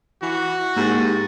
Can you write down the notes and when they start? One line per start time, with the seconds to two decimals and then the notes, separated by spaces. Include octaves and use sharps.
0.22 E3 F#4
0.76 G#2 A#3 G4 A6